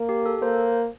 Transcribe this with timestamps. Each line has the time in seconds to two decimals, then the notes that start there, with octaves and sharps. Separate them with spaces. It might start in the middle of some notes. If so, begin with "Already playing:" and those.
Already playing: A#3
0.09 G4
0.26 A4
0.42 A#3 C5